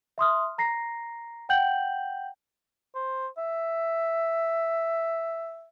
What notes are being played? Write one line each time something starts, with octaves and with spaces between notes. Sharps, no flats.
E5 C6 D#6 F6
A#5 A#6 C7
F#5 G5 G6 F#7
C5
E5